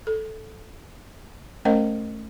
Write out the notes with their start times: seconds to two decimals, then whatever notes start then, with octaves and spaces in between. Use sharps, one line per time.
0.07 A4
1.65 A3 C#4 A#4 C5 D#5 F5